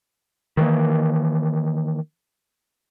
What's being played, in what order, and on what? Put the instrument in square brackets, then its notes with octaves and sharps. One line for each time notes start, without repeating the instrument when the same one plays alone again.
[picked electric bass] D#3 E3 G3 A#3